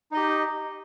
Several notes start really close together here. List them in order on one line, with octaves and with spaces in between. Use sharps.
D#4 D#5 G4